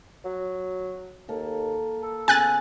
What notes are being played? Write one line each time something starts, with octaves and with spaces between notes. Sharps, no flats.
F#3
D#2 A#3 A4
A4
C#3 B3 G#4 G#5 F#6 A6